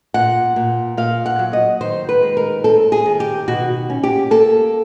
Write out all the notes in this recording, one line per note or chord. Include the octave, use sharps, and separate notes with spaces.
A#2 F#5
A#2
A#2 F5
F#5
F#3
D#5
D#3 C5
B4
G#3
A#4
C4 A4
G#4
D#3
G4
B2 F#4
C#4
G4
A#3 A4